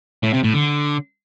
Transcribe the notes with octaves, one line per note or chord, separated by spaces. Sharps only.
A2
C3
A2
D3